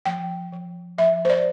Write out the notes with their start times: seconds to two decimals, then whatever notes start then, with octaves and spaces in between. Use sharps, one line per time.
0.06 F3 G5
0.52 F3
0.98 F3 E5
1.25 C5
1.30 D5